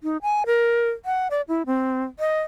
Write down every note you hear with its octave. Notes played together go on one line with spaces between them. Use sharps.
D#4
G#5
A#4
F#5
D5
E4
C4
D#5